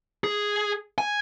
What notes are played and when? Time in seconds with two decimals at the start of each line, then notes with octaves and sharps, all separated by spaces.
0.24 G#4
0.98 G#5